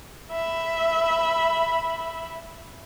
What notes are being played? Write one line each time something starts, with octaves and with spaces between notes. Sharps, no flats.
E5 B5